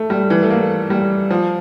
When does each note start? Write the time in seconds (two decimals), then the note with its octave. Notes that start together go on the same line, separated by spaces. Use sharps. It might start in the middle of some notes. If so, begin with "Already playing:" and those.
Already playing: A3
0.10 G3
0.30 E3
0.43 A3
0.50 A#3
0.90 G3
1.30 F3